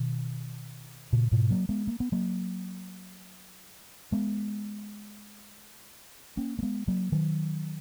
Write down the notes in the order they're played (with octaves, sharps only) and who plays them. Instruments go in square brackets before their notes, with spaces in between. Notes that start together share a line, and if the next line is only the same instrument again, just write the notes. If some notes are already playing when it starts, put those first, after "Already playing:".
Already playing: [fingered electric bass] B2 D#3
A#2 C#3
G#2 B2
F#3 A#3
G#3 B3
A#3
B3
F#3 A#3
G#3 B3
A#3 C#4
A#3
G#3 B3
F#3 A#3
D#3 F#3